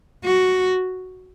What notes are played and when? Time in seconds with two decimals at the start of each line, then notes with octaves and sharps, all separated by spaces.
0.25 F#4